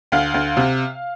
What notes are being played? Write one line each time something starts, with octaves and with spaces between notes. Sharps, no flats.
D2 F5
D2
C3